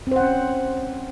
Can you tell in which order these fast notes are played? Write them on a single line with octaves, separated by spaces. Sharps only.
C4 C5 F#5 C#4